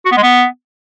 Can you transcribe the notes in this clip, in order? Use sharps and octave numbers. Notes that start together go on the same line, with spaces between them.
F#4
B3
G#3
B3